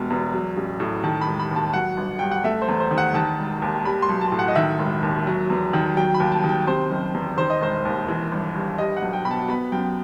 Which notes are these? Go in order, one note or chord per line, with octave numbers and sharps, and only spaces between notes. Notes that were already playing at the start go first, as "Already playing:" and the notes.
Already playing: E1 B2
E2
F#3
A1
A2
D#3 A5
B5
E1
B5
D#2
A5
F#3 F#5
G1
G2 G5
F#5
A3 E5
C5
E2
C5
D#3
F#5
D#3 A5
E1
D#2
G3 B5
C6
B1
A5
A2
F#5
D#5
D#3 E5
E1
D#2
F#3
E2
D#3
F#3 G5
B5
D#2
A5
D#3
G5
C3 C5
F#1
E2
D#3 C5
D#5
E1 C5
D#2
E3
G1
G2
G3 D#5
F#5
B1
G5
B2 B5
A5
B3 B5
F#2 G5